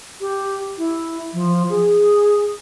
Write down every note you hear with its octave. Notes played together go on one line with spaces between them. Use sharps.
G4
E4
F3
G#4